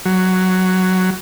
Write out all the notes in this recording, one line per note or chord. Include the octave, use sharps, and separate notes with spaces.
F#3